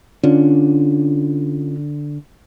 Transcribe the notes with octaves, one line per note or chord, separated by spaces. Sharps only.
D3 C#4 D4 F4